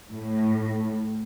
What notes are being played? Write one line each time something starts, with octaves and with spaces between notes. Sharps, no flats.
A2